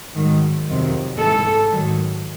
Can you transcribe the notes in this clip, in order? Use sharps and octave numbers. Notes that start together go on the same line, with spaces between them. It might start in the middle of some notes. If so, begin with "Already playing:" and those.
G#2 D#3 F#3
F2 C3 D#3 F#3
G#2 E3 A4
G#2 D#3 F#3